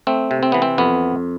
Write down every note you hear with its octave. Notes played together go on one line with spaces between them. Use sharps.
A3 C4
C3
C4
E3 B3
C4
F2 B3